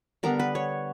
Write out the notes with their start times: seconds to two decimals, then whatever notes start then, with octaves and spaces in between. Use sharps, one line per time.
0.23 D3 G3 B3 D4 A#4
0.40 B4
0.55 C#5